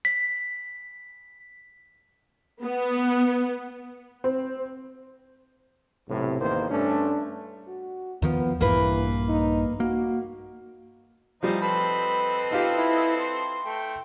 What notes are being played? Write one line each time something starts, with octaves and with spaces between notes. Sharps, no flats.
B6
B3
C4
B1 A2 C3
A1 E2 D#3 A#3 C5
G2 A3 C#4 D4
F#4
D#2 D#3 F3 B3
A#1 G2 E3 A#3 B4
D#4
A#3 F#4
E3 F3 G3 D#4 C5
C4 A4 B4 D#5 B5
D#4 F4 G4
E4
C6
A3 G5